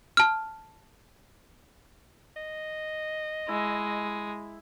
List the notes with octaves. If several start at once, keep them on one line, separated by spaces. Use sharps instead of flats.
A5 F6
D#5
G#3 E4